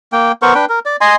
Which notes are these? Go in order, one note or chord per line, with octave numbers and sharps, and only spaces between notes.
A#3 G5
B3 A#4 C5 C#6
D4 B4 G5
A#4
D5
D#5 G#5 C6